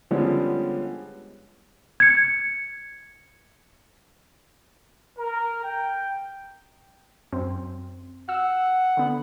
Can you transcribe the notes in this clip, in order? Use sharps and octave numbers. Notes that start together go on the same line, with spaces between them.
D3 F3 G3 G#3 B3 C#4
G#6 C#7
A#4
G5
F#2 C4
F#5 E6
D3 B3